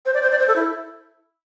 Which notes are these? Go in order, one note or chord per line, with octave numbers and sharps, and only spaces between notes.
C5
D5
C5
D5
C5
A4
E4